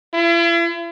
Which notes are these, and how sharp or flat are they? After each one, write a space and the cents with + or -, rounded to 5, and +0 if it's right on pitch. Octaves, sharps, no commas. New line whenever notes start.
E4 +45